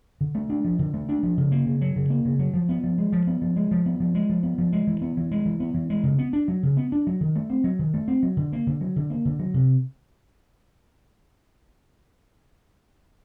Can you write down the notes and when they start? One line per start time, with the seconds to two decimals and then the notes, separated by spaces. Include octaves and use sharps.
0.21 D3
0.35 A3
0.50 D4
0.65 F3
0.79 D3
0.94 A3
1.09 D4
1.23 F3
1.37 C#3
1.52 A#3
1.66 C#3
1.81 F#3
1.96 C#3
2.10 A#3
2.25 C#3
2.39 F#3
2.54 F3
2.69 B3
2.84 F3
2.98 G#3
3.13 F3
3.27 B3
3.42 F3
3.56 G#3
3.71 F3
3.86 B3
4.00 F3
4.15 G#3
4.30 F3
4.43 B3
4.58 F3
4.73 G#3
4.87 E3
5.02 B3
5.17 E3
5.31 G#3
5.46 E3
5.60 B3
5.74 E3
5.90 G#3
6.04 C#3
6.19 B3
6.33 D4
6.48 F#3
6.63 C#3
6.77 B3
6.92 D4
7.07 F#3
7.21 D#3
7.36 A3
7.50 C4
7.64 F#3
7.79 D#3
7.94 A3
8.08 C4
8.23 F#3
8.37 D3
8.53 A#3
8.67 D3
8.81 F#3
8.96 D3
9.10 A#3
9.25 D3
9.39 F#3
9.54 C3